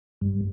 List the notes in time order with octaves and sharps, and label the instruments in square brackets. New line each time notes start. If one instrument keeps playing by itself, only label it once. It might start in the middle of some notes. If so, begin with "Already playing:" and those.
[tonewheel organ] G2